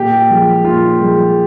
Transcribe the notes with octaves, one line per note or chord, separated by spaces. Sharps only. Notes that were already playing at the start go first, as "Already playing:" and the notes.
Already playing: A#2 G4
F3 G#3
A#2 F4
F3 G#3